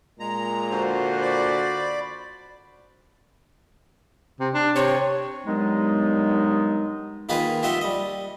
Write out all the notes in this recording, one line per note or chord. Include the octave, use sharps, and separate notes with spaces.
A#2 G#3 A#5
D3 F#4 C5
D5 B5 D6
C3
D4
C3 C#5
G2 D#3 F#3 G#3 B3 D#4
D#3 A#3 D#4 F4 G#4 B4
F4 G4 D#5 E5 F#5 C6
G3 D#5